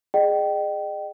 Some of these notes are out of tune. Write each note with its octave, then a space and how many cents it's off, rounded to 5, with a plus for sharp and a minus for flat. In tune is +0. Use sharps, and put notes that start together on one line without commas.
G#4 +0 D#5 -40 G5 -25